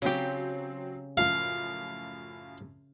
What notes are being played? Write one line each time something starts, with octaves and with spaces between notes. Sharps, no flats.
C#3 F#3 C4 G4
F#2 A2 F3 F5